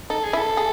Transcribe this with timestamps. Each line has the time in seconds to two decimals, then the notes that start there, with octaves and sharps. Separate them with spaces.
0.10 D#4 A4
0.24 G#4
0.33 E4
0.37 A4
0.57 G#4